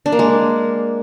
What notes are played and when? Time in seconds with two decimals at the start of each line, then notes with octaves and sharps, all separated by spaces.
0.06 D4
0.12 A#3
0.19 G#3